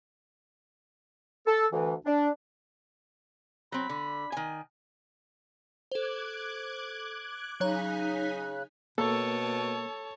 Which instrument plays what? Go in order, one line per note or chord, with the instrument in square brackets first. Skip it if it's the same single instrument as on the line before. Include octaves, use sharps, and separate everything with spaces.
[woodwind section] A4
D2 E3
D4
[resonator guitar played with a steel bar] F#3 C4 [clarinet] B5
[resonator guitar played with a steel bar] D3
D#3 G#5
[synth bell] A4 C5 [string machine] D6 F#6 G#6
[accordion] C#3 F#6 [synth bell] F#3 C#5 A#5 [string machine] D#4 G#5 B6
[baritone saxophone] B2 [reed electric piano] A#3 A#4 [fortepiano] A4 [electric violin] C#5 A5